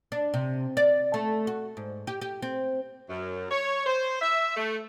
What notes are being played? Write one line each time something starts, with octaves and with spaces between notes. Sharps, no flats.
D4
C3
D5
A3
F#4
G#2
G4
G4
C4
F#2
C#5
C5
E5
A3